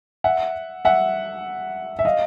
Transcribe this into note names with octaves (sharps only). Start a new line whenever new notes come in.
E5 F#5
E5 F#5
E5
D#5 F5